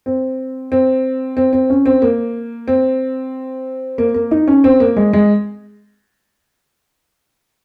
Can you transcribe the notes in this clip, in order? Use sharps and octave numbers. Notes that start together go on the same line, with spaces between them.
C4
C4
C4
C4
C#4
C4
A#3
C4
A#3
A#3
D#4
C#4
C4
A#3
G#3
G#3